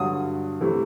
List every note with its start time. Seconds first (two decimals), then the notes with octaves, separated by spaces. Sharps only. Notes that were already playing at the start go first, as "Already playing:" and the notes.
Already playing: G2 D3 F#3 D#6
0.60 C3 E3 A3